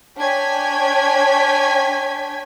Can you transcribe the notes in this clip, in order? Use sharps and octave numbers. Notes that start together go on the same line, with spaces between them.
D4 C#5 G5 G#5 G#6 B6